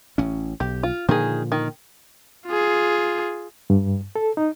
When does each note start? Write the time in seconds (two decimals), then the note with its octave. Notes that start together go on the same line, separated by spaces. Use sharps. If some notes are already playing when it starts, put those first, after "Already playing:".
0.18 A1 C#4
0.60 B1 G4
0.83 F4
1.09 A#2 D3 D#3 F3 G#4
1.52 D#3
2.46 F4 G#4
3.70 G2
4.16 A4
4.37 D#4